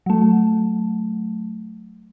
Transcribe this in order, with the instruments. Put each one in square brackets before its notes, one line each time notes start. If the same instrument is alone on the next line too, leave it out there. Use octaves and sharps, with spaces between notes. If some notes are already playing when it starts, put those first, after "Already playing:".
[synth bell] F#3 A3